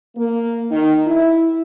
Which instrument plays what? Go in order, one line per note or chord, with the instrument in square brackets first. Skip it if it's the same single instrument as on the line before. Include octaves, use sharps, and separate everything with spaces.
[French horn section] A#3
D#3
E4